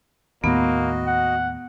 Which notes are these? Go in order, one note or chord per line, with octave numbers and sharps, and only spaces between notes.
D#2 A2 A#3 B3 F#4 D#5
F#5